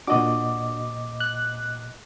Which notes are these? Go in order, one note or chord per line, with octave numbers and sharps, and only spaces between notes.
A#2 D4 F#4 D#5 D6
F#6